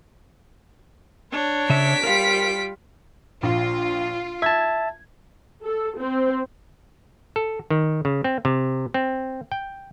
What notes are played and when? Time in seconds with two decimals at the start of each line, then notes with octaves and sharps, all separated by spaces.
1.32 D4 C#5
1.70 C#3 E5 B6 D7
2.04 G3 F4 A#4 F5
3.43 A#1 F4
4.42 E5 A5 G#6
5.63 A4
5.98 C4
7.36 A4
7.70 D#3
8.05 C#3
8.24 C4
8.45 C3
8.94 C4
9.52 G5